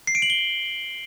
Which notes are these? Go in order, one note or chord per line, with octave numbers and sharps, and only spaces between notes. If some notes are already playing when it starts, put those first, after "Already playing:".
C7
D7
F#7
G7